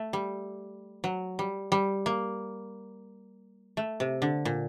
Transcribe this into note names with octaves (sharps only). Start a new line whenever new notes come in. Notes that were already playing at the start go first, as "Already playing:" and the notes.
Already playing: A3
G3
F#3
G3
G3
A#3
A3
C3
D3
A#2